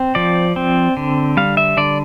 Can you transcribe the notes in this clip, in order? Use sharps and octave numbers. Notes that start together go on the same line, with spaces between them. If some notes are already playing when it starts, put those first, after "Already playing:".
Already playing: C4
F3 D5
C4
D3
G3 F5
E5
D3 D5